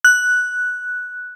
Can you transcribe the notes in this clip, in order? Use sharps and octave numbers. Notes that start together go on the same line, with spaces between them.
F#6